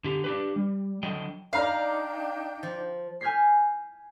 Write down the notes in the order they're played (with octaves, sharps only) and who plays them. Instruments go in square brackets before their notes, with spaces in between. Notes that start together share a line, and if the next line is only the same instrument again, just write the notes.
[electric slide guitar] D3 G4
D4 G4 B4
G3
D3 F#3 A4 D#5 G5
[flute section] D4 D#4 G5 [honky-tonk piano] D5 A#5 F6 [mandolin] F5
[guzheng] F3
[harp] G#5 F6 G6 G#6 B6 C7